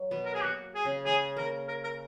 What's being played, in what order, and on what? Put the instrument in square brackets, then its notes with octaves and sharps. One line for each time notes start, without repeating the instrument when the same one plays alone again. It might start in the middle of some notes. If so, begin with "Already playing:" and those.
Already playing: [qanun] F#3
B2 B3
[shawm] A#4
G#4
[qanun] A#3 [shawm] F#4
[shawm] G#4
[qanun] C#3
[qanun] G#3 [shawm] G#4
[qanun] A#3 [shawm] A#4
[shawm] A#4
A#4